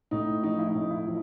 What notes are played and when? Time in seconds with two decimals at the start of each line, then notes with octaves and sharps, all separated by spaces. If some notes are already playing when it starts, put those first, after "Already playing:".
0.11 A2 D#4
0.43 F3 D#4
0.59 E4
0.67 D#4
0.74 A2
0.81 D#4
0.91 E4
1.07 F3